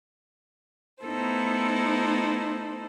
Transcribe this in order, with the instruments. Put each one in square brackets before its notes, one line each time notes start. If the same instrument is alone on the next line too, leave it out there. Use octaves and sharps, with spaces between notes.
[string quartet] A3 B3 D#4 E4 A4 C5